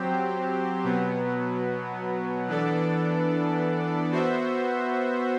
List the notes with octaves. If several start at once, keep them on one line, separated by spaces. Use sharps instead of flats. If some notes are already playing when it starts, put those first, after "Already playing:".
Already playing: F#3 C4 G4 C5
B2 F#3 B3
E3 B3 D4 A4 D5
B3 F#4 C5 E5